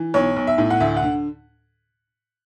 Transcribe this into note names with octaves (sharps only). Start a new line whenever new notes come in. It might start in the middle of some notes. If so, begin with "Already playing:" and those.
Already playing: E3
B1 C#5
B1
E5
A2
F#5
D2 E5
F#5
D3